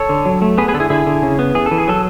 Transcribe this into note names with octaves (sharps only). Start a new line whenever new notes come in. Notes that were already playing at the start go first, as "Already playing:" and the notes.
Already playing: A4 C#5
D3
F#3
A3
B3 G#4 B4
G#4 B4
D3 A4
E4 G#4
D3 E4 G#4
D3
C#3
B3
E3 G#4
A4
E3
G#4
F#3 A4